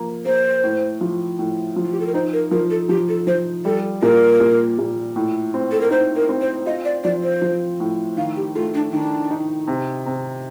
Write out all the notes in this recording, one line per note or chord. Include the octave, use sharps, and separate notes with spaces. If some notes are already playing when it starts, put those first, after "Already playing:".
Already playing: F3 A#3
A#3 C5
A2
F3
A2
F3
F4
G4
A4
A#4
D#4 C5
A#4
F3 A#4
A4
F3 G4
A4
F3 C5
G3 A4
A#2 A#4
A#2
A#2
A2
C4
A4
A#4
D#4 C5
A#4
C4
C5
F4 D#5
D5
F3 D5
C5
F3
A2
D#3 F5
G4
A3 F4
D4
D#3 D4
D#4
C3
C3